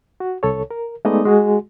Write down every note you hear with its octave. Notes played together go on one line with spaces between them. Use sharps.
F#4
C2 A4 C#5
A#4
G#3 A3 B3 D#4 D5 D#5
G#3 F#4 G#4